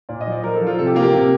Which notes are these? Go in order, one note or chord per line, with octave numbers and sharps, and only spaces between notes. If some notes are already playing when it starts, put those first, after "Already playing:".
A#2 D5
D#5
F3
D5
F3 A#4
A4
F3
F4
C3 A4
G4
A#3 F4
G4
C3